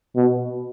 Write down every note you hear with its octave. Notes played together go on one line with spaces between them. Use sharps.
B2